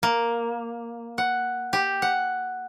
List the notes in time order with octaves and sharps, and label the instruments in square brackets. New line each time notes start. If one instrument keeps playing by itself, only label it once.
[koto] A#3
F#5
G4
F#5